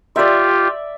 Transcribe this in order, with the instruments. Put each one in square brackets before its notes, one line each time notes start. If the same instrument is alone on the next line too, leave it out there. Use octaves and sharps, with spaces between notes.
[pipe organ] F4 G4 [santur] D5 E5